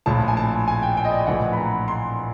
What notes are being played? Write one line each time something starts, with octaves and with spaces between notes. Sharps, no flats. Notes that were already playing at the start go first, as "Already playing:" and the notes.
A#1 A2 F3 A5
G#5
A5
G#5
G5
G5
D#5
D5
A#1 A2 E3 F#5
B5
A#5
C6